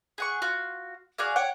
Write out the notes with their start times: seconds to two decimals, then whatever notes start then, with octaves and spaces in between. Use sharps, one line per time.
0.18 G#4 F#5 C#6
0.42 F4 F#4
1.18 F#4 G#4 D5 F5
1.36 C#5 F#5 G5